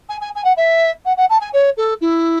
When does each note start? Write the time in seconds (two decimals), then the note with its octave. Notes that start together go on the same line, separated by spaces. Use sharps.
0.09 G#5
0.21 G#5
0.35 G#5
0.44 F#5
0.57 E5
1.05 F#5
1.17 F#5
1.30 A5
1.41 G#5
1.53 C#5
1.77 A4
2.01 E4